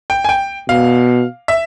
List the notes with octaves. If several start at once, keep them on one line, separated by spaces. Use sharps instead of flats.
G5
G#5
G5
B2 F5
E5